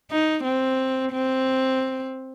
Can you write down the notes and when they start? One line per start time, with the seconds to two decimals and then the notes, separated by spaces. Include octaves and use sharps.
0.11 D#4
0.44 C4
1.12 C4